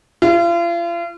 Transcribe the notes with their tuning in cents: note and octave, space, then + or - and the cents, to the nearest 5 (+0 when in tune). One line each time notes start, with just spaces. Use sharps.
F4 -40